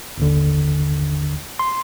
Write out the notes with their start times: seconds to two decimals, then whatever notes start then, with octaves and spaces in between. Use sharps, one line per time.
0.18 G1 D#2 D3
1.59 C6